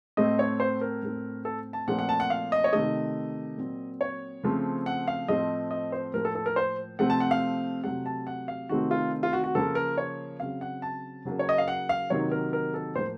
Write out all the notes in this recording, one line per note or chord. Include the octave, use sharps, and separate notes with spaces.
A2 A3 C4 D#5
C#5
C5
A#4
A2 A3 C4
A4
A5
A#2 F3 A3 C4 F#5
F#5
A5
F#5
F5
D#5
C#5
C3 D#3 A3 D#5
A#2 F#3 C4
C#5
C#3 F3 A3 C4
F#5
F5
A2 F3 A3 C4 D#5
D#5
C5
A2 F3 A#3 A#4
A4
A4
A#4
C5
C3 F3 A3 C4 F#5
A5
F#5
F5
C3 F#3 A3 F#5
A5
F#5
F5
C3 D#3 A3 C4 F#4
F4
F4
F#4
F#4
C#3 F3 A#3 A4
A#4
C#5
C#3 F#3 C4 F5
F#5
A5
C#3 F#3 A#3
C#5
D#5
F5
F#5
F5
C3 D#3 F#3 A#3 C#5
A#4
A#4
A4
A2 F3 A#3 C5